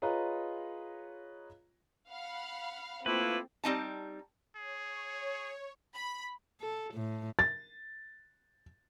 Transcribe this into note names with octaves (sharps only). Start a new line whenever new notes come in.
F4 G#4 B4 C#5 D#5 A#5
F5 F#5 B5
A3 A#3 C4 E4 F4 B4
G3 C4 D#4 A5
G#4 C#5
B5
A4
A2
A6